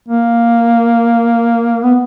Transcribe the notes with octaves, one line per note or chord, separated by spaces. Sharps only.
A#3
B3